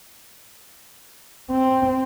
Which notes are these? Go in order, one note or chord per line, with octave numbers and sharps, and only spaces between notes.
C4